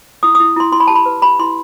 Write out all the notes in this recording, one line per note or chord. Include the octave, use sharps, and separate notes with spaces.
E4 D#6
E4 D#6
E4 C6
E4 C6
B5
G4 A5
B5
B4
G4 B5
E4 C6